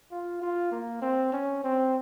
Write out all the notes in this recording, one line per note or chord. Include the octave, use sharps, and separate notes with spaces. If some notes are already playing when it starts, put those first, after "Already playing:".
F4
F4
A#3
C4
C#4
C4